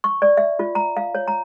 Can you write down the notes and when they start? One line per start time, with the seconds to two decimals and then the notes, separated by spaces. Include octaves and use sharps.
0.04 C#6
0.22 D5
0.37 E5
0.59 F4
0.75 A#5
0.97 F5
1.15 C#5
1.28 A#5